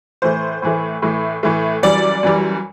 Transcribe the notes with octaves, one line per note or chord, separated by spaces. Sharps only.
A2 E3 A3 C5
A2 E3 A3
A2 E3 A3
A2 E3 A3
F#2 E3 G3 D5
F#2 E3 G3